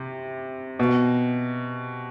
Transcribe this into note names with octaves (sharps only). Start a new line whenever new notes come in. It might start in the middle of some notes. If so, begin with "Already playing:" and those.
Already playing: C3
B2